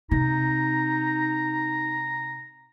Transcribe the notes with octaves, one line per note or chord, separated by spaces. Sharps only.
C3 D#4 A#5